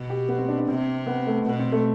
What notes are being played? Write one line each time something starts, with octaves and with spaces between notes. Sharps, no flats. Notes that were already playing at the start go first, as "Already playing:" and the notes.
Already playing: B2
G4
B3
C4
D4
D4
C3 C4
B3
A3
B2 B3
C4
A3